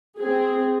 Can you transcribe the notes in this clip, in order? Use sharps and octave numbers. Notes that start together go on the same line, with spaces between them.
C4 G#4